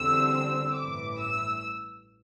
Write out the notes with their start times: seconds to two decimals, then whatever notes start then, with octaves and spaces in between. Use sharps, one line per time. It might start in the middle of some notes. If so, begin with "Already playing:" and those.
Already playing: E2 D3 G3 C4 E6
0.35 E6
0.77 A1 G2 E3 D6
1.20 E6